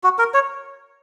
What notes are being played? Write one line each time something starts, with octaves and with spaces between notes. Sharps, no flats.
F#4
A#4
C#5